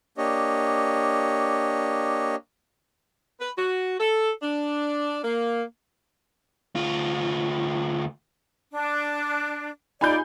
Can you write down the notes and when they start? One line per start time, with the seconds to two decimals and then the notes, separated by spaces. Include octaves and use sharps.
0.18 A#3 D4 G4 C#5 D#5
3.40 B4
3.57 F#4
3.99 A4
4.42 D4
5.23 A#3
6.75 D2 F4
8.73 D4
10.01 D#4 F4 D5 G#5 B5 G6